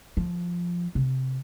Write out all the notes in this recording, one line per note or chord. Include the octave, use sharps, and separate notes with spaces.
F3
C3